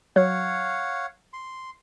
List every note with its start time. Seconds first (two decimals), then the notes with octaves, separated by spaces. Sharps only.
0.16 F#3 C#5 F5 F#5
1.33 C6